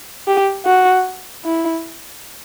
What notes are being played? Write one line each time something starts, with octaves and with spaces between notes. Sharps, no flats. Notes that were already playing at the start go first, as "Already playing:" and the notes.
G4
F#4
E4